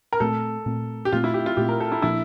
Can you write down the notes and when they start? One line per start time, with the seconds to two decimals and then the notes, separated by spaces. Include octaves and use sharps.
0.13 A#4
0.20 A#2 A3 C4 A4
0.66 A#2 A3 C4
1.05 G4
1.12 A#2 A3 C4 F4
1.24 E4
1.34 G4
1.46 F4
1.57 A#2 A3 C4 G4
1.69 A#4
1.80 A4
1.92 E4
2.02 A#2 F3 A#3 D4 E4